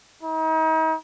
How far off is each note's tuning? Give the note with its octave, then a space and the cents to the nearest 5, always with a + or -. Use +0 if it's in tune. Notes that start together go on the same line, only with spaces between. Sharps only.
D#4 +40